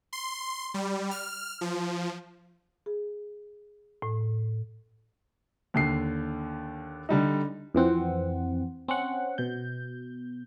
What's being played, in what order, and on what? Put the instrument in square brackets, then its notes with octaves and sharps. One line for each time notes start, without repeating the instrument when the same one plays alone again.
[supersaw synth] C6
G3
F6
F3
[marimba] G#4
A2
[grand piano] D#2 D3 C7
D3 G3 D#4
[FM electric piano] F2 E3 C4 F#5
C4 C#4 F#5
B2 G6